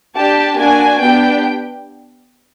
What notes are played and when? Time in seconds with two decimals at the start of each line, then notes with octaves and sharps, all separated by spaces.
0.16 D4 G4 A5
0.58 A#3 D4 F#4 G#5
1.01 B3 D4 G4 G5